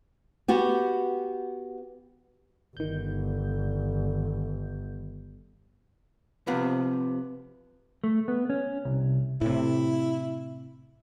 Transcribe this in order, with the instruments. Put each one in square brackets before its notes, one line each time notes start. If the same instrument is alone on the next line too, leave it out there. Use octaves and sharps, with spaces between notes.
[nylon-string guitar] B3 F#4 G4
[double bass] G1 [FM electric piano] D#3 G6
[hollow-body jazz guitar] C3 F3 B3
[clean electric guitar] A3
B3
C#4
C2
[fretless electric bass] A2 C3 [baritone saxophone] E4